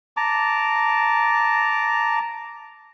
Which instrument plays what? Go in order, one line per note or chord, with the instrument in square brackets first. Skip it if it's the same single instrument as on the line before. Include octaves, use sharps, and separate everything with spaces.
[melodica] A5 A#5 D6